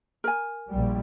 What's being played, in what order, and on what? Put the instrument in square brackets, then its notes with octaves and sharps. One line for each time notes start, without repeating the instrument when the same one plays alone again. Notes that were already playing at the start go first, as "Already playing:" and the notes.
[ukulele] A#4 G#5
[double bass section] A#1 G3